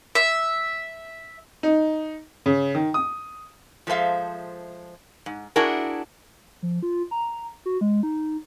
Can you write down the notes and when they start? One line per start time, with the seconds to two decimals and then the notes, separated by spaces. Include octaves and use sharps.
0.15 E5
1.63 D#4
2.46 C#3
2.75 D#3
2.94 D#6
3.87 F3 G#3 A4 C5 E5 F5
5.26 G#2
5.56 D4 E4 F#4 G#4 A#4
6.63 F3
6.82 F4
7.11 A#5
7.66 F#4
7.81 G#3
8.03 D#4